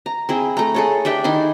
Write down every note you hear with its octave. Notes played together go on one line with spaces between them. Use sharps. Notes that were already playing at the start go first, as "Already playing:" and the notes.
A#5
C4 E4 G#4
A3 A#5
G#4 A4 C#5
D4 G4 E5 G5
D#3 D#4 E4 C6